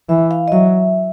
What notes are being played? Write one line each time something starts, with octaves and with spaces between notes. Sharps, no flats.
E3 E5
F5
D#5
F#3 E5